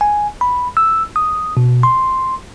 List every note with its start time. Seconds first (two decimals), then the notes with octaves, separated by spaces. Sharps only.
0.01 G#5
0.41 B5
0.77 E6
1.16 D#6
1.57 B2
1.83 C6